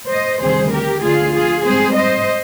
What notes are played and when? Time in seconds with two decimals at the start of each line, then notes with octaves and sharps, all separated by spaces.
0.09 C5 D#5
0.41 D2 C3 D#3 G3 G#4 C5
0.72 G4 A#4
1.03 D2 D3 F3 F4 G#4
1.34 F4 G#4
1.65 G#2 G3 C4 G#4 C5
1.96 C5 D#5